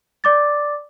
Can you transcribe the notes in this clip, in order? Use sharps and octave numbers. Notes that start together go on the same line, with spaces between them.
D5 D6 A6